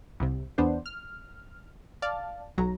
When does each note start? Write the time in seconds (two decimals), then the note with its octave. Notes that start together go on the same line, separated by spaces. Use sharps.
0.20 C2 C3
0.58 E2 B3 D4 C5
0.86 F6
2.02 D5 F5 A5
2.58 B1 F#3 A#5